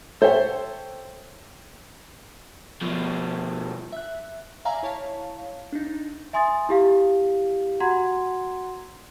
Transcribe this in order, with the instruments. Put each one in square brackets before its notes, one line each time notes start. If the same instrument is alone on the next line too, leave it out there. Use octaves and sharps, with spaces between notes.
[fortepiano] A4 C5 C#5 E5 G5
[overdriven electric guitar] B2 F3
[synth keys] E5 F#6
D5 E5 F5 G#5 A#5
E4 C#5 F5 A5
D4 D#4
[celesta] E5 G#5 C6 D#6 A6
E4 G4 F5
F#4 F#5 A#5 C6 G#6